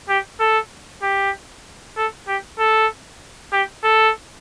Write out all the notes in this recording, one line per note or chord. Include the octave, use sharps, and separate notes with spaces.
G4
A4
G4
A4
G4
A4
G4
A4